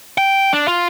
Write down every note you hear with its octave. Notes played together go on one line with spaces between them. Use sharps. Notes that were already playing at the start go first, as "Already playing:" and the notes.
G5
D4
F4